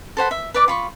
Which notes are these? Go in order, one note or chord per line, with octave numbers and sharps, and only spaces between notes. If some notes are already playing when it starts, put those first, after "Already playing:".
A4 C5 F#5 B5
E5
B4 D5 D6
F4 B5 C#6